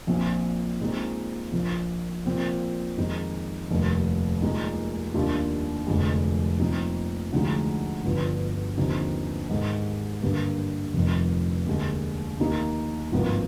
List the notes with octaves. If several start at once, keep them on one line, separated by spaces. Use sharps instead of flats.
A#1 A#2 F3 C4 F4
A#2 G#3 C4 D#4
A#1 A#2 F3
A#2 F3 C4 F4
F2 D#3 G#3 D#4
F1 D#2 D#3
A#2 G#3 D#4
D#2 D#3 G3 D4 F4
F1 F2 D3 G#3
A#2 F3 C4 D#4
D2 D3 F3 G#3 D#4
G1 G2 D3 F3
D#2 D3 F3 C4 D#4
G#2 D#3 G#3
G2 D3 G3 A#3 D4
F1 F2 D#3
D#2 D3 G#3
D#2 D#3 A#3 D#4
G#1 G2 F3 A#3